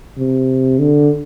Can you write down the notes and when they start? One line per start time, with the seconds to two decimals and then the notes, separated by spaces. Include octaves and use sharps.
0.18 C3
0.79 D3